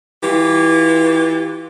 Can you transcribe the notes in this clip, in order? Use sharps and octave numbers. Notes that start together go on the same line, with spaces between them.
E3 F4 G4